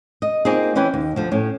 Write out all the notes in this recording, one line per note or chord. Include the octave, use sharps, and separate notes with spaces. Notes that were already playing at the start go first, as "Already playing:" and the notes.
D#5
A#3 C4 D#4 F4 G#4
E3 C#4 E4 B4 G5
D#2
D2 F3
A2 C#4